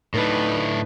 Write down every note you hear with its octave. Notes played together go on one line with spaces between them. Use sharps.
A2 D4 D#4 B4